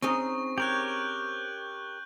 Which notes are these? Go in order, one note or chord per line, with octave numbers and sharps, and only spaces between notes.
C4 C#4 D#4 G#4 D#5 C#6
G4 A#4 C#5 F#6 G6 F#7